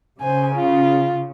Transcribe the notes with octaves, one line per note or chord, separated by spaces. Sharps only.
C#3 C5 G#5
F4